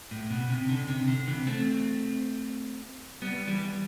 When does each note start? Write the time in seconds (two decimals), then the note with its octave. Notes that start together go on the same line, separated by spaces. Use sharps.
0.11 A2
0.30 B2
0.50 C3
0.69 D3
0.88 C3
1.08 D3
1.27 C3 E3
1.47 A3 C4
3.22 G3 B3
3.47 E3 G3